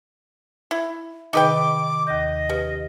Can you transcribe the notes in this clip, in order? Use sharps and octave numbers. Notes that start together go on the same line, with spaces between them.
E4
C3 D#3 D#4 G#4 B4 G5 D6
D#2 D#5 G6
C#3 G4 B4